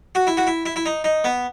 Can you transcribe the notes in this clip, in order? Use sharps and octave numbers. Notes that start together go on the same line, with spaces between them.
F#4
E4
F#4
E4
E4
E4
D#4
D#4
B3